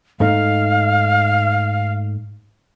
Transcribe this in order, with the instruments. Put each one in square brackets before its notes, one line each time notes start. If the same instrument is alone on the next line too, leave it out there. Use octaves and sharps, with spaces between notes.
[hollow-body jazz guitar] G#2 A3 D#4 [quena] F5